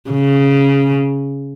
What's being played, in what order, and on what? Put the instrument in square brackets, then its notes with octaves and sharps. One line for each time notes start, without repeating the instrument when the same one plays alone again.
[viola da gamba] C#3